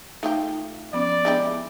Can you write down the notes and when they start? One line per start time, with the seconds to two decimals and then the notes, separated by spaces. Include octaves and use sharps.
0.23 A3 D#4 F4 G4
0.93 F3 B3 C#4 D5
1.25 G#3 B3 D4 E4 G4 D#5